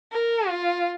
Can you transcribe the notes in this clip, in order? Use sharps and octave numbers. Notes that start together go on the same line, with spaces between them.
A#4
F4